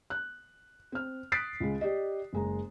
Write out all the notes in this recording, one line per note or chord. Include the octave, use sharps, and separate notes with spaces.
F#6
C4 F6
D#6 F#6 A6 B6 C7 D7
C#2 G#3
G4 D5 D#5
F#1 G#3 A#5